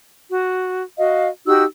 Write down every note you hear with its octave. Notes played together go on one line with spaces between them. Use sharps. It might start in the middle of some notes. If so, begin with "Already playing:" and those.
F#4
F#4 D#5 F5
D#4 F#4 G4 E6